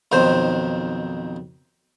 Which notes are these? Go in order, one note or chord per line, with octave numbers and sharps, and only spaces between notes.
B1 F2 D#3 C5